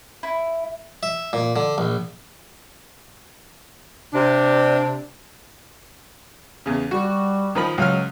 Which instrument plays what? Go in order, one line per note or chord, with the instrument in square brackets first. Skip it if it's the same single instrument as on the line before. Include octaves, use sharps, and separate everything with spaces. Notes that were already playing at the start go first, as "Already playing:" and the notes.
[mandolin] E4
[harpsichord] E5
A#2
D3
A#1
[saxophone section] C3 D4
[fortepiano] E2 C#3
[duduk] G3 [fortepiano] F#4
[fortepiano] D#3 F3 B5
[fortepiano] C#2 F5 F6 [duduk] F#3